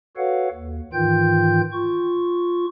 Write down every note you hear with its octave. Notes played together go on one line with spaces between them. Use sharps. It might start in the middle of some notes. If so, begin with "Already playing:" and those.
F#4 A4 B4 C#5 F5 F#5
D#2
G#2 D#3 E3 F4 G5 G6
F4 C#6